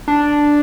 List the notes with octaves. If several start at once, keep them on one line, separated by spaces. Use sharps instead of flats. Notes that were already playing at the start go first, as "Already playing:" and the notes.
D4